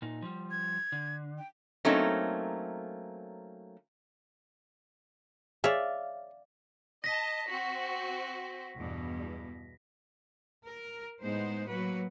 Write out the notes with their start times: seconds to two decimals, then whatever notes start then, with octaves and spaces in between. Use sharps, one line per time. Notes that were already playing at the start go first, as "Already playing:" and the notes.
0.02 A#2 D#4
0.22 F3 G3
0.51 G#6
0.92 D3
1.38 G5
1.85 F#3 A3 A#3 C4 C#4 D#4
5.64 G#4 C#5 D5 E5 F5
7.04 D#5 A5 A#6 B6
7.50 C4 F#4
8.76 E2 G2 B2
10.66 A#4
11.22 A2 G#3 B3 D#4 C5
11.69 F#3 A#3 F#4 B4